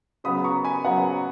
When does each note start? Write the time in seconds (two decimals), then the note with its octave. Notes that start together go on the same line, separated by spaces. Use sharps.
0.24 C#3 F#3 B3 B5 D#6
0.44 A#5 C#6
0.64 G#5 B5
0.85 C#3 F#3 B3 F#5 A#5